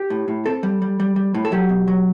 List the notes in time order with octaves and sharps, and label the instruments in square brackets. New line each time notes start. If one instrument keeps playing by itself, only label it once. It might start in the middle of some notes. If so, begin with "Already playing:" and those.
Already playing: [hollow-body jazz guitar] G4
A2
A2
C4 A4
G3
G3
G3
G3
A2
A4
F#3 G4
B2
F#3